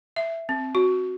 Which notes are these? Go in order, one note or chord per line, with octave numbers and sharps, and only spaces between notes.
E5
C4
F#4